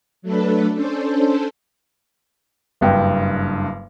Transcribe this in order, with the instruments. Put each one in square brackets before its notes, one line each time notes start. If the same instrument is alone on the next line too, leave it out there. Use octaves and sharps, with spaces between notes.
[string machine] F#3 A3 D4 A4 B4
C#4 D4 A4 C5
[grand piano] F#1 G2 G5